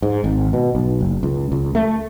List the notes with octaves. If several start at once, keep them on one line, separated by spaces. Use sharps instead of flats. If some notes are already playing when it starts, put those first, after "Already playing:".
G#2
G#1
B2
B1
F#1
C#2
C#2
A3